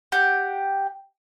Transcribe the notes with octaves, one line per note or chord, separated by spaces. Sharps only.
G4 F#5